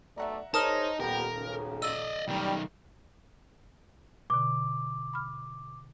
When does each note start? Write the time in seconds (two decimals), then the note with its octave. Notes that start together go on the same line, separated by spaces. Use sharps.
0.18 B1 A3 D5 E5 F#5 A#5
0.54 D#4 G#4 A#4 C5 C#5 A5 D#6 F6
1.00 D#1 A#2 B3 G4 A#4 A#5
1.37 B1 C#3
1.82 D5 D#5 E6
2.28 B1 D#3 G3
4.30 B2 D3 D6
5.14 B5 F6